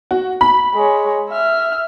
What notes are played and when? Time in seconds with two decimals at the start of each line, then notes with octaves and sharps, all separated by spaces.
0.11 F#4
0.41 B5
0.74 G#3 C#5
1.29 E5 F6